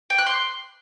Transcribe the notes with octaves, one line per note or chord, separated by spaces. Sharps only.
G5
F#6
C6